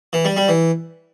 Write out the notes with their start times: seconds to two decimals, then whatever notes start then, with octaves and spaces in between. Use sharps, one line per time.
0.13 E3
0.25 G3
0.37 G3
0.48 E3